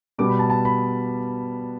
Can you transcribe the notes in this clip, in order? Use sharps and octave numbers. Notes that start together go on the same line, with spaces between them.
B2 G3 B3 D6
B5
A5
A5
B5